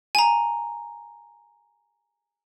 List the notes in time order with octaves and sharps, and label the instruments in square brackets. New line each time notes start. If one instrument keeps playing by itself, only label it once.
[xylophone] G#5 A#5